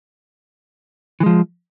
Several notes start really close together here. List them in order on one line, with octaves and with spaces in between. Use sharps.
E3 G#3 F3